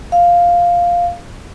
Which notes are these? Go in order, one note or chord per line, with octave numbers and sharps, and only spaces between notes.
F5